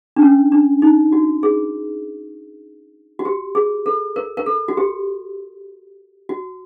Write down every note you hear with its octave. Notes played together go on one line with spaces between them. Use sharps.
D4
C#4
D4
D#4
F#4
G#4
F#4
G4
G#4
A4
A#4
A#4
A4
F#4
G4
F#4